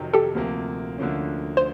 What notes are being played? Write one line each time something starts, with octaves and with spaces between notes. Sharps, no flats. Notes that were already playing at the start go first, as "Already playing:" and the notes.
Already playing: F2 C3 D#3 F#3
G4 A4
D2 C3 F3 A#3
D2 D3 F3 A#3 C#4
C5